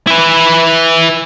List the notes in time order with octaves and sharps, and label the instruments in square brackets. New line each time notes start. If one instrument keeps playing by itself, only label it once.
[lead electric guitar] E4 B4